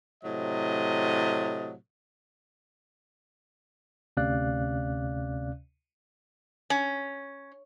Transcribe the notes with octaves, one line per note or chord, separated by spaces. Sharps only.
A2 C3 F#3 D#5
D2 C3 C#4 D5 F5 F#6
C#4